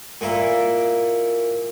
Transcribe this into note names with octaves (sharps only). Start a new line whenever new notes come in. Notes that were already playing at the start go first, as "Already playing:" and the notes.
A#2 A#3 E4